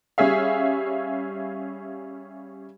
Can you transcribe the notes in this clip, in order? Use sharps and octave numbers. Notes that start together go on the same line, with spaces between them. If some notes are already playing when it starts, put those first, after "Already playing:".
G3 C#4 G#4 E5 F5